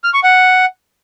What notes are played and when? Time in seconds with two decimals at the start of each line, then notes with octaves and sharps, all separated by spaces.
0.04 F6
0.14 C#6
0.23 F#5